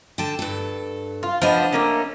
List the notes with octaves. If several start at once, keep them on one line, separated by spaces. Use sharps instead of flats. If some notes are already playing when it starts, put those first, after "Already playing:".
D3 G5 A5
G2 A4
F4
F3 B3 D4 D#5
A3 A#3 C#4